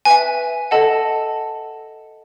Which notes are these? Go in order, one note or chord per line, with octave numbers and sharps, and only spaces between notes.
B4 E5 G#5
A4 D#5 F#5 A5